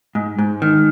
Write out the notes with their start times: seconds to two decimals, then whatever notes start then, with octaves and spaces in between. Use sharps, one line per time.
0.15 G#2
0.38 G#2
0.62 D#3